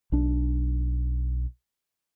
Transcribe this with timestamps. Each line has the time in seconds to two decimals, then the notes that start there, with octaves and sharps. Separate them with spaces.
0.12 B1 D4